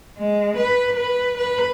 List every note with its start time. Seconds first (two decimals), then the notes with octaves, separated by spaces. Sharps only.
0.18 G#3
0.57 B4
0.96 B4
1.37 B4